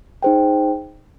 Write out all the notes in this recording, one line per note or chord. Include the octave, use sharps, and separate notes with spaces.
D#4 G#4 C5 G5